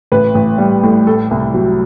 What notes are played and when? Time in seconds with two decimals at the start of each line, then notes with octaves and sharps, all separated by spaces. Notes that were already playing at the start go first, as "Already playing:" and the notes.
0.12 A1 B4
0.35 A1
0.58 G3
0.83 A2
1.07 A3 A4
1.31 C2
1.54 F#3